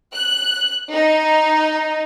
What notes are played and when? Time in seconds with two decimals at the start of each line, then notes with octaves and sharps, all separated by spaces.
0.14 F#6
0.92 D#4